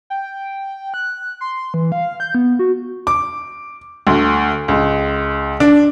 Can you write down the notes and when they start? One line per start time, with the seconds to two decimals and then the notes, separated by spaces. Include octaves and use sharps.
0.10 G5
0.94 F#6
1.41 C6
1.74 E3
1.92 F5
2.20 G6
2.35 B3
2.59 F#4
3.07 D6
4.07 D2
4.68 C#2
5.60 D4